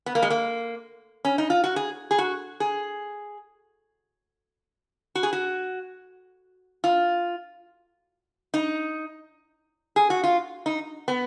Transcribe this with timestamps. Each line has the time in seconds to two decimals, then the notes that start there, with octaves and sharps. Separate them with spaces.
0.06 B3
0.15 A#3
0.22 G#3
0.30 A#3
1.25 C#4
1.38 D#4
1.50 F4
1.64 F#4
1.76 G#4
2.11 G#4
2.18 F#4
2.60 G#4
5.15 F#4
5.23 G#4
5.33 F#4
6.84 F4
8.54 D#4
9.96 G#4
10.10 F#4
10.24 F4
10.66 D#4
11.08 B3